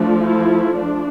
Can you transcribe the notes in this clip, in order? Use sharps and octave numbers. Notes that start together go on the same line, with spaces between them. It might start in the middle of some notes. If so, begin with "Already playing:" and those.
Already playing: F3 A3 D4
E4
D4